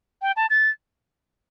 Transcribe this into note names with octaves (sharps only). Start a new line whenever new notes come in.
G5
A5
A6